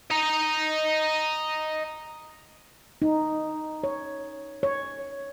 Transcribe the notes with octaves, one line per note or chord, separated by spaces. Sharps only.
D#5 A#5
D#4
C#5
C#5